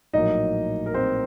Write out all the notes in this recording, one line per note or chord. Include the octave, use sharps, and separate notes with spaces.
A#1 A2 F#3 A#3 D#4 D#5
A#4
C4 C5